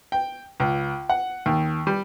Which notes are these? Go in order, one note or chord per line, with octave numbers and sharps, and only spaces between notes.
G5
C#2
F#5
D#2
G3